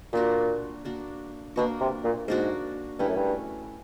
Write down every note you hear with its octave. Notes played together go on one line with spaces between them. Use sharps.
A#2 A#3 D4 F#4
A#3 D4 F#4
B2 A#3 D4 F#4
C3
A#2
G#2 A#3 D4 F#4
G2 A3 C#4 E4
F#2
G2